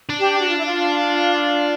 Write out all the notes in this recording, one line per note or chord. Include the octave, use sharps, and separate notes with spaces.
D4
G4
F#4
F4
E4
F4